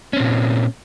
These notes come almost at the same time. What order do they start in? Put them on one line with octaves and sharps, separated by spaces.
C#4 C4 A#2